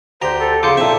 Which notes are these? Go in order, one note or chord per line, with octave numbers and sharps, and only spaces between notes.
D2 G4 C5 A#5
A4
F2 C#3 C6 D6 G6 C#7
A#2 C4 E4 A4 E5